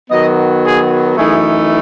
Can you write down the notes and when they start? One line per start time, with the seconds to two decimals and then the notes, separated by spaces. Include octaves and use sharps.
0.10 D#3 F#3 B3 D#5
0.64 G#4
1.17 F#2 E3 A3 D#4 G#4